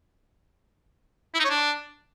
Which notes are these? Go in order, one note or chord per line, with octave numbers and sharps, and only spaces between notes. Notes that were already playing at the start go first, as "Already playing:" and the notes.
E4
D#4
C#5
D4